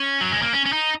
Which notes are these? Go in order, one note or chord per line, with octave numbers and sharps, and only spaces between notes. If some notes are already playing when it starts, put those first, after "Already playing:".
Already playing: C#4
F#3
G#3
A#3
C#4
C#4
D#4